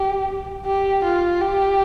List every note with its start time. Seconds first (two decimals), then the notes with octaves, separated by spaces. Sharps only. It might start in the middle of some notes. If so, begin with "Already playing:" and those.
Already playing: G4
0.66 G4
1.04 F4
1.41 G4